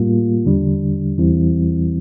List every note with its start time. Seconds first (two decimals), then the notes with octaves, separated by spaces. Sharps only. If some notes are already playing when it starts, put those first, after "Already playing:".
Already playing: A2 G3 A#3 F4
0.45 E2 D3 G3 D4
1.18 E2 E3 G3 C4 E4